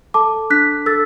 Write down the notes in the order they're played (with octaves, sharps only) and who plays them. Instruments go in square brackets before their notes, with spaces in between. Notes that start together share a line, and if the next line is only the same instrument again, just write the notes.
[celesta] A4 A5 D6
D4 F#6 B6
A4 E6 A6